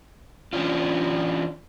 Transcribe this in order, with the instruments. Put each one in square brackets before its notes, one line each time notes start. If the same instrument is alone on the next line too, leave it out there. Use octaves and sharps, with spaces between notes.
[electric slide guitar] E3 C#4 D4 F4